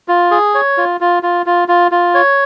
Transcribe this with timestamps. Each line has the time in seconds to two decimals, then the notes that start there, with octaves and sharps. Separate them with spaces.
0.08 F4
0.31 G#4
0.55 C#5
0.78 F4
1.01 F4
1.23 F4
1.46 F4
1.68 F4
1.92 F4
2.14 C#5